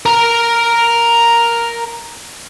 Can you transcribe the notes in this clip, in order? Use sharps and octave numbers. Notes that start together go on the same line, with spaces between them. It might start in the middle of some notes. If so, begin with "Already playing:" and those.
A#4 A#5